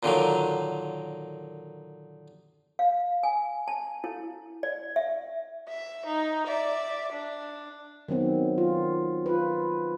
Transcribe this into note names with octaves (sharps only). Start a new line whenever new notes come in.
A#2 D3 D#3 F#3
F5
G#5
A5
E4
D5
E5
E5
D#4
D5 E5
D4
D#3 F#3 B3 C4
F4
F4 B4